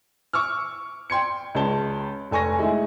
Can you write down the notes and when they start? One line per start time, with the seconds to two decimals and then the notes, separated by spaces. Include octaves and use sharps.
0.33 C#6 D6 E6 F6
1.10 G5 C6 G#6 C#7
1.55 C#2 G#3 C#4 A5 G7
2.31 F1 A4 G#5 C#6 A#6
2.59 G#3 A3 D#4 E4